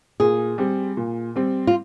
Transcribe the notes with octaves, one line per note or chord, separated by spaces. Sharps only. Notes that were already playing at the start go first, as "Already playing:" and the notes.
A#2 G#4
G3 C4
A#2
G3 C4
F4